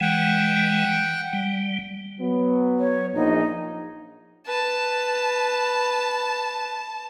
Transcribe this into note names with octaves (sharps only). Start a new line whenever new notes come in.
E3 G#3 F#5 G5
G3
F#3 B3
C#5
A#1 D#4
B4 A5